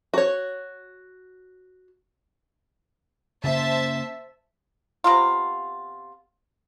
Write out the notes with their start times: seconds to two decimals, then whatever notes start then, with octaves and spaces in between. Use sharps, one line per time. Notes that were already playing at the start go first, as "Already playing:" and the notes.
0.14 F#4 C#5
3.44 C#3 A#3 C5 E5 A5
5.04 C3 B3 F4